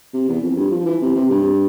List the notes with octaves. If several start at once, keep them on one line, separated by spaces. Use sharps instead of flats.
C3
E2
F2
G2
F3
E3
C3
C3
G2